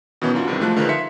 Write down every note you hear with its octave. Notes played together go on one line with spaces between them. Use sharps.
B2 D#3 E3 B3 C#4
F#2 D4 F4 F#4
G2 C3 D#3 E3
G#2 F3 A3 F4 A5 F#6
D3 D#3 F3 G#3 B4
E5 F5 C6 B6 C#7